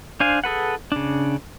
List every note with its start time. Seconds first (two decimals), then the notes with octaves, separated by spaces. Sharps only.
0.20 D4 C5 F5 G#5
0.44 G#4 A4 B4 F#5
0.92 C#3 D4